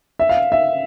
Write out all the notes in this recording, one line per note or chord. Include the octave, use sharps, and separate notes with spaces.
E5
F5
E5